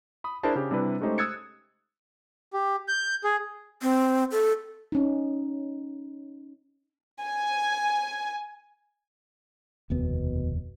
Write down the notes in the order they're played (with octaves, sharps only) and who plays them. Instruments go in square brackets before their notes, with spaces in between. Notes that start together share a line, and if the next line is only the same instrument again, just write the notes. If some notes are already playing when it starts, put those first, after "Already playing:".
[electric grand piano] B5 D#6
D4 E4 G#4 A#4 C5 A5
C#3 G4
C3 G3 D4 E4 B4
G#3 A3 C#4 D#4 G4 C5
D#6 E6 F#6 G#6 A6 C#7
[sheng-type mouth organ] G4
G6
G#4
[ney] C4
A4
[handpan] C#4 D#4
[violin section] G#5
[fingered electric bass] F1 D#2 B3 [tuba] B2